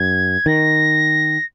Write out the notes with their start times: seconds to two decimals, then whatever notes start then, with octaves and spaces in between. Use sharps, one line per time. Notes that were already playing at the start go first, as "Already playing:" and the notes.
Already playing: F#2 G#6
0.46 D#3 A#6